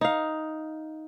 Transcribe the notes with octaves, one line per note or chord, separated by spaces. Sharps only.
D#4 F5